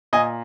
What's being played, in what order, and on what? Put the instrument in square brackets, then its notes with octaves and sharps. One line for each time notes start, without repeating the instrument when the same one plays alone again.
[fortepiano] A#2 D#5 G#5